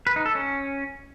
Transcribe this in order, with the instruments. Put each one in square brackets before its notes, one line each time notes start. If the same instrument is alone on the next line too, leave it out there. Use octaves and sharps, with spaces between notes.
[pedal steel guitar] B4
D#4
A4
C#4